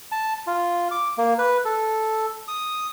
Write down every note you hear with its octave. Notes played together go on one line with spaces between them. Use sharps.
A5
F4
D6
A#3
B4
A4
D#6